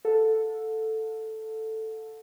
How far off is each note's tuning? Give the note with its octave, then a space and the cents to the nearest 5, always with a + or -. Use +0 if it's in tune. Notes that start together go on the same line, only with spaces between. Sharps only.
A4 +0 F#5 -45